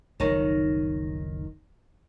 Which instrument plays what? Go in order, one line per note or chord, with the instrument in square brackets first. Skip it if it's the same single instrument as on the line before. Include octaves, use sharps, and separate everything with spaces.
[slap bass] F#1 C#2 F3 [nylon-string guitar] D#3 D#4 C#5